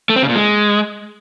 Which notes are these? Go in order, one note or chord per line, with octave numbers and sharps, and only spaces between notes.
A3
C4
C#3
A#2
G#3